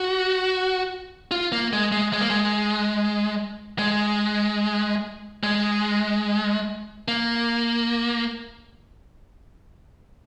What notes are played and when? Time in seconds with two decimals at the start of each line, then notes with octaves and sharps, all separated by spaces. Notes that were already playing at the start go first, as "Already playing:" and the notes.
Already playing: F#4
1.31 F4
1.52 A#3
1.73 G#3
1.92 G#3
2.13 G#3
2.21 A#3
2.29 G#3
3.79 G#3
5.43 G#3
7.08 A#3